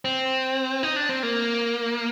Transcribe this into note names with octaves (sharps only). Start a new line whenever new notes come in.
C4
D#4
D4
C4
A#3